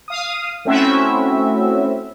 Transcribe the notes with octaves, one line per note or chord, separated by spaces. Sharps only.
F5 D#6
A3 C4 C#4 E4 F#4 E5